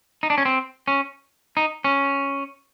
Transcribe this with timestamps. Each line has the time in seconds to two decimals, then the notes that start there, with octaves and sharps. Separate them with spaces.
0.23 D#4
0.30 D4
0.38 C#4
0.45 C4
0.88 C#4
1.57 D#4
1.84 C#4